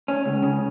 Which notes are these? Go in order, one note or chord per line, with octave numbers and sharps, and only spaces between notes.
C#4
C#2
C#3